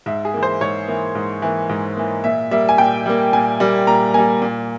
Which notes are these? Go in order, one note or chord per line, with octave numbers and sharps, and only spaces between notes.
G#2 E5
G#4
E3 A#3
C5
G#2 C#5
E3 A#3
G#2
E3 A#3
G#2
E3 A#3
A#2 E5
G3 A#3 E5
G#5
A#2 G5
G3 A#3
A#2 G#5
G3 A#3
A#2 A#5
G3 A#3 G#5
A#2